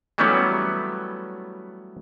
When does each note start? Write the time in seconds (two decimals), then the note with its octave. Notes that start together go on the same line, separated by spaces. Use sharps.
0.18 E3 F#3 G3 A3 B3 C#4